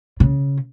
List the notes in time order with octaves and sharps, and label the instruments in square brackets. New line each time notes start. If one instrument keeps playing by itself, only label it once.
[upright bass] C#3